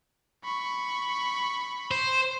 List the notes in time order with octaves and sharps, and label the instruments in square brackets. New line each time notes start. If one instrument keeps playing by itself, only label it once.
[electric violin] B5 C#6
[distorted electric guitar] C5